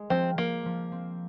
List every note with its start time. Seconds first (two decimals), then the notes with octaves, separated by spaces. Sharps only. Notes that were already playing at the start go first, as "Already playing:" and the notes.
Already playing: G#3
0.10 F3 C4
0.38 F3 A#3
0.66 F3
0.92 C4